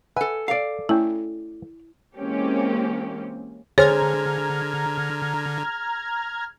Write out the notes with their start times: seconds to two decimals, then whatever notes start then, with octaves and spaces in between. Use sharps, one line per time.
0.16 A4 B4 E5 F#5 G#5
0.48 D5 F5
0.89 A3 C#4 E4 G5
2.17 E3 G#3 A#3 C4 C#4 G4
3.78 D3 G#4 C5 C#5 A#5 F6 G#6